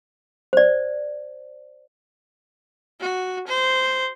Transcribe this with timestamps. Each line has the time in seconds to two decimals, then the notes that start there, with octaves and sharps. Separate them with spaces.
0.53 C5 D5
3.00 F#4
3.47 C5